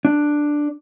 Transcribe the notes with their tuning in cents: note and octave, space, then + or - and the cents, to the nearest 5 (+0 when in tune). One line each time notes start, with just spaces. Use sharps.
D4 +5